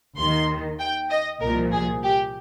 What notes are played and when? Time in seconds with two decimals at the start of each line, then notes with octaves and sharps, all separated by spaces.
0.18 D#2 D#3 C6
0.79 G5
1.10 D#5
1.41 C2 A#2 F3 A#4
1.72 G#4
2.03 G4